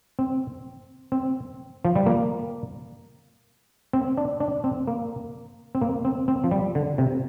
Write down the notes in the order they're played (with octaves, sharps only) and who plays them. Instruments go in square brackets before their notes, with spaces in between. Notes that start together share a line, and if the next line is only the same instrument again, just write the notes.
[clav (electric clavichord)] C4
C4
F3
G3
A#3
C4
D4
D4
C4
A#3
C4
A#3
C4
C4
F3
G3
D3
C3